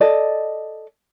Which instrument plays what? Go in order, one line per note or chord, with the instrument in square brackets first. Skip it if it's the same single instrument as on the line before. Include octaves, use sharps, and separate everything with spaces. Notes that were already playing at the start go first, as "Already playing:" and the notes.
[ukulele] A4 D5 D#5